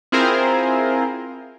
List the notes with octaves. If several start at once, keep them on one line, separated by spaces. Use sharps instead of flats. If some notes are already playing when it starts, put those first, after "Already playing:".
C4 E4 F4 G#4 A#4 C5